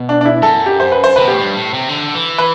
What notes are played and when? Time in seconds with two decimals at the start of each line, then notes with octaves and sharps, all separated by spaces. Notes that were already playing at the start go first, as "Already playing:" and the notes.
Already playing: B2
0.09 D4
0.21 D4
0.25 E4
0.42 F#2 A4
0.66 G4
0.80 C5
0.92 B4
1.04 C5
1.16 C3 B4
1.25 B2 G4
1.33 A2
1.40 G2
1.57 A2
1.74 C3
1.89 D3
2.15 E3
2.38 B4